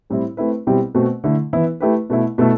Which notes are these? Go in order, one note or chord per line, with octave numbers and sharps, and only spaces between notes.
A2 G3 C4 E4
A3 C4 E4 B4
B2 G3 C4 E4 G4
B2 A3 C4 F#4 C5
D3 A3 E4
E3 B3 E4
A3 E4 G4 B4
B2 A3 E4
B2 A3 E4 A4